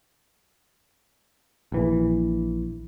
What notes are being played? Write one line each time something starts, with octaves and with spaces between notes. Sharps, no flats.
A#1 E3